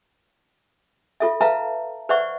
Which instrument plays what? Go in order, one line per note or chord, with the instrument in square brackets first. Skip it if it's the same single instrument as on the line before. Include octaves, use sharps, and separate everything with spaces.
[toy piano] F4 A4 E5
B4 E5 F5 A5 A#5
B4 C5 D5 E5 F#5 C#6